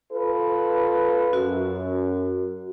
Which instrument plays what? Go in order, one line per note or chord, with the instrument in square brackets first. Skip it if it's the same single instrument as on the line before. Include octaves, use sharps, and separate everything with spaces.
[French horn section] F4 A4 B4
[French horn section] F#2 [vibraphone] F#4